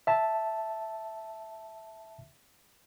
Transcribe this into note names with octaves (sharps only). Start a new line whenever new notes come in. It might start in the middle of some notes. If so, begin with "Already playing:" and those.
E5 A5